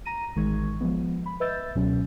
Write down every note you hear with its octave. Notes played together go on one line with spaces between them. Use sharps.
A#5 A#6 D#7
A1 D#3 G#3 C#6 G#6
F3 G#3 B3
B5
B4 D#5 E5 E6 G6 A6
C#2 B2 F#3 C#4